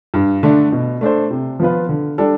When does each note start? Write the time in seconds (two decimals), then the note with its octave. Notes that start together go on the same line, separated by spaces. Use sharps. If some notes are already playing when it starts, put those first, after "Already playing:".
0.14 G2
0.43 D3 A3 D4
0.72 B2
1.01 A3 D4 A4 C5
1.31 C3
1.60 F3 B3 F4 B4
1.89 D3
2.18 G3 D4 A4